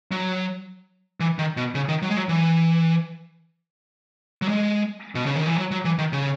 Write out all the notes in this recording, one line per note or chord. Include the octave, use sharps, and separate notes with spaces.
F#3
E3
D#3
B2
C#3
D#3
F#3
G#3
F#3
E3
F#3
G#3
B2
C#3
D#3
E3
F#3
F#3
E3
D#3
C#3